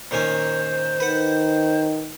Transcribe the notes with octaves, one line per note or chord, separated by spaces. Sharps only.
A#2 D#3 C#4 C5
D#3 B4 F#5